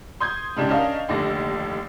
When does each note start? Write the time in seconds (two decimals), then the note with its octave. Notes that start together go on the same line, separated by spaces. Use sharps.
0.20 C6 D#6 G6 G#6
0.57 G#2 C#3 D4 G4
0.69 C#4 D4 A#4 D#5 F5
1.09 F1 D#2 D3 D6 A#6